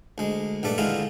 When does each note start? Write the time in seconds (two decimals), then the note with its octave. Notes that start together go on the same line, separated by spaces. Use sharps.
0.18 D2 G#3
0.63 A#1 G2 A3 D5
0.78 D3 D#3 G#3 E4 F4